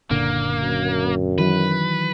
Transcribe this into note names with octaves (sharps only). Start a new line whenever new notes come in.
F#1 A#2 D3 A#3
F#2
D#3 E3 F#3 B4